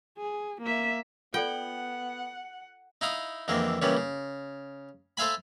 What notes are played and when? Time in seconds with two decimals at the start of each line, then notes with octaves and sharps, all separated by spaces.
0.18 G#4
0.62 A#3 E5
1.34 B3 F4 A4 D5 F#5 G5
3.01 D#4 E4 F5 D#6
3.48 F2 D3 E3 G#3 A#3 C4
3.82 A#2 C#3 E3 G3 B3 C#4
3.97 C#3
5.17 A4 C5 E5 F5 G#5 B5